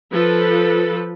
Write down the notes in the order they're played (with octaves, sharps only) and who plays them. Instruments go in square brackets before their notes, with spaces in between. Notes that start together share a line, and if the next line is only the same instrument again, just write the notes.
[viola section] F3 A4 B4